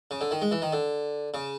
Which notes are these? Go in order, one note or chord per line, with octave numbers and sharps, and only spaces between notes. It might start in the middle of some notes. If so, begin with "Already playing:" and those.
C#3
D3
D#3
G#3
E3
D#3
D3
C#3